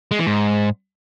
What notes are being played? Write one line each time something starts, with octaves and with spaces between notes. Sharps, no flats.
G#3
E3
G#2